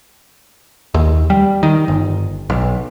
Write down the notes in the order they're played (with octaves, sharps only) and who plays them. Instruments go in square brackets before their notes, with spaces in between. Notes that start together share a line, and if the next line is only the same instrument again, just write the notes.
[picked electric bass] D#2
G3
D#3
G1
B1